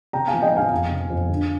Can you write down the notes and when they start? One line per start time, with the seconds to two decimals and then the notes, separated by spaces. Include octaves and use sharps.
0.13 C3 G5 A#5
0.28 F5 G#5
0.33 F3
0.42 D#5 G5
0.52 C4 F5 G#5
0.71 F2
0.90 C3
1.10 F2
1.29 D3